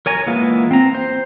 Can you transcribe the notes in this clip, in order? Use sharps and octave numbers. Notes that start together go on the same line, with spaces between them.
A#4 C#5 G#5 A#5
E3 G#3 A#3 B3 F4
C4 A#5
C5